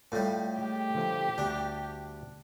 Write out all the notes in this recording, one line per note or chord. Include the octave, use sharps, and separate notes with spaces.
A2 G3 F4 D5
G#3 G4
D3 F3 A3
D2 G3 D4